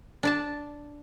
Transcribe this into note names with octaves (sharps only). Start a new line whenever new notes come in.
D4 D5 A5